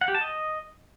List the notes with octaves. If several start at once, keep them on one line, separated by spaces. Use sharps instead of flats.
F#5
G4
A5
D#5